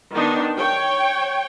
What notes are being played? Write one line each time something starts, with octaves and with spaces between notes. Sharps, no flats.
D#3 B3 D4 D#4
C#5 G5